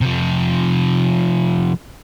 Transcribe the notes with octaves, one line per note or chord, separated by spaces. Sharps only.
C3 F3